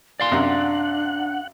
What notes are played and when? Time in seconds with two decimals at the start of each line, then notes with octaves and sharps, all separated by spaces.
0.20 D5 F5 G#5 C6
0.32 F#2 C3 D4 F#5